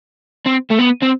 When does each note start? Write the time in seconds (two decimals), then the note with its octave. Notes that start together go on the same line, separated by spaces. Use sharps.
0.46 C4
0.71 A3
0.79 B3
1.03 C4